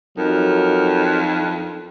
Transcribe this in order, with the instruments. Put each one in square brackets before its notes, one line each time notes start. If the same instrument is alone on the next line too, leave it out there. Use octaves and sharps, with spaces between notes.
[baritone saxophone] F2 [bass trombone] F#3 [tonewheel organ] D#4 [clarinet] A#4